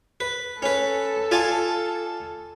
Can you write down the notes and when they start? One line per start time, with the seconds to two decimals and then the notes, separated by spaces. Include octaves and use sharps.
0.20 B4
0.62 C#4 A4 B4
1.31 F4 D5 G#5